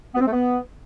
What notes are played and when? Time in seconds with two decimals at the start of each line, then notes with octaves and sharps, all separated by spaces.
0.15 B3
0.21 C4
0.26 A3
0.32 B3